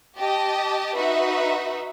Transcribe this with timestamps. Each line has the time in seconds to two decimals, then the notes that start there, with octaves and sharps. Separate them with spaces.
0.16 G4 D#5 A5
0.96 D#4 F#4 B4 E5